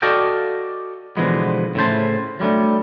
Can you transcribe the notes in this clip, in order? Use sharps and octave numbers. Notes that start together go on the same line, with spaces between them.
F#4 A4 D5 D#5 F5 G5
B2 D3 E3 F3 G#3 B3
A2 C#3 E4 C5 A5
F#3 G3 A3 D4